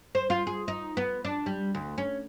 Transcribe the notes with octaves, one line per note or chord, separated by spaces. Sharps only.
C5
F4
G#4
D#4
B3
D4
G3
D2
C#4